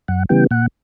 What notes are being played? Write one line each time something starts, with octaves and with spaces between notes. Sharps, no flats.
F#2 F#5
C#3 E3 G3 B3 G5
A#2 F#5